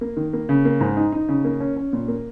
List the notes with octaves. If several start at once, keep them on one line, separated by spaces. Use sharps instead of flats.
A#3
D#3
A#3
C#3
A#3
G#2
D#4
D#4
C#3
A#3
C#4
C#4
A#2
A#3